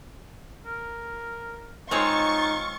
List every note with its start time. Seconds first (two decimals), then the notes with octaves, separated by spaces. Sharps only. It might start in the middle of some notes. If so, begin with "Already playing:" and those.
0.65 A#4
1.91 G#3 C4 D#4 F4 C#5 C#6 A6